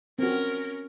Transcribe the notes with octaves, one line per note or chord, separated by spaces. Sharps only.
C4 C#4 F#4 A#4